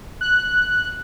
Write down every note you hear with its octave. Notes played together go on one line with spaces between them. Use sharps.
F#6